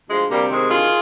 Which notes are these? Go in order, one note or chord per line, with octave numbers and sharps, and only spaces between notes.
D2 F3 G#3
C3 G3 A#3
D#3 G#3 C4
D2 F4 G#4